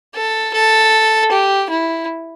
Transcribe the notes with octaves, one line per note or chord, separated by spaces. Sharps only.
A4
A4
G4
E4